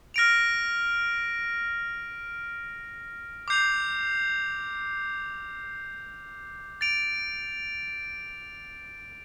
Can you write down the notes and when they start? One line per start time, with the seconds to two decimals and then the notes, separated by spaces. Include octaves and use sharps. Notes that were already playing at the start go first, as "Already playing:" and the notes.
0.14 F6 A#6 D7 F7
3.48 D6 G6 C7 F7
6.81 A6 D7 F7